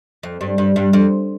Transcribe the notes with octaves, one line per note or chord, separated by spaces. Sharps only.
F2
G2
G2
G2
F2